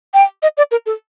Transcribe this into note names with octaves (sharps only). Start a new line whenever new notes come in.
G5
D#5
D5
A#4
A4